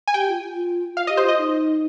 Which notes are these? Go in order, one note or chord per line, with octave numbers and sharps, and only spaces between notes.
G#5
G4 G5
F4
F4
F4 F5
D#5
G4
C5
F4
D#5
D#4